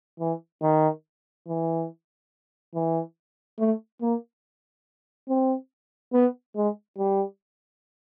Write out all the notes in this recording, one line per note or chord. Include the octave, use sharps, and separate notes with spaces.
E3
D#3
E3
E3
A3
A#3
C4
B3
G#3
G3